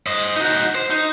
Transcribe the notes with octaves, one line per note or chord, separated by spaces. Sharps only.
C5 D#5
D#4 F#4
C5
D#4